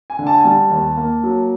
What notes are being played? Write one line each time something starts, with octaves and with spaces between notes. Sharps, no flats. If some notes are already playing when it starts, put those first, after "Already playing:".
G#5
D3
A5
G#5
G3 A5
D#2
A#3
F#3